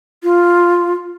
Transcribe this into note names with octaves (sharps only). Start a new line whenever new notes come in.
F4